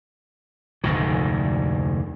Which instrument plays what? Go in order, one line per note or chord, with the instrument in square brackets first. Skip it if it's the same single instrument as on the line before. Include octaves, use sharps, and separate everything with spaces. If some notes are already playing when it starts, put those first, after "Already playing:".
[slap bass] F1 D2 G#2 D#3